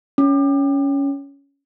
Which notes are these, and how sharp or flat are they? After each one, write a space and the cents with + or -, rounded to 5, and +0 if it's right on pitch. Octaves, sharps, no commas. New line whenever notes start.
C#4 +10